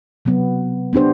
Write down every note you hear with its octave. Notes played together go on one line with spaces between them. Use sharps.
C3 F#3 B3
B3 D4 G4 C5